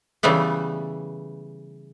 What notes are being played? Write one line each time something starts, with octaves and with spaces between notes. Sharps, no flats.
C#3 E3 G3 A3 B3